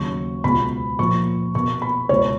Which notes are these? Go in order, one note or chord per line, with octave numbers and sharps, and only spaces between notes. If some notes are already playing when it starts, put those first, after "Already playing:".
Already playing: D#2 C#3 F#3 C#6
C#2 B2 G#3 B5
A#2 F3 A#3 C#6
B2 A#3 C#6
B5
C#2 B2 A#3 C#5